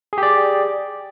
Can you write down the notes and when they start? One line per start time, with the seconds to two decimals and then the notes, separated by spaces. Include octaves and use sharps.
0.13 G#4
0.18 G4
0.23 D5